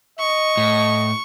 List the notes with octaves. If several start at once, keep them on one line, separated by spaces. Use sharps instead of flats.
D#5 C#6
A2